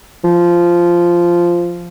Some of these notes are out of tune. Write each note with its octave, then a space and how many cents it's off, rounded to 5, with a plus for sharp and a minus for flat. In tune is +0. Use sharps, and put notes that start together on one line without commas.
F3 -10